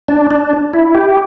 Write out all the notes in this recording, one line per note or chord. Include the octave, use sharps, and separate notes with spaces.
D4
D4
E4
G4